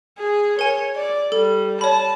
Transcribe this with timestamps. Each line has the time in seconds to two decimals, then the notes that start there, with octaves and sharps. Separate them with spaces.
0.18 G#4
0.59 A#4 C#5 G#5
0.96 D5
1.32 G3 A4
1.81 C#5 A5 B5